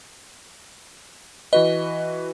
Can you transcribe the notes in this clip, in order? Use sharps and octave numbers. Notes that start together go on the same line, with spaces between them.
E3 F#4 B4 D#5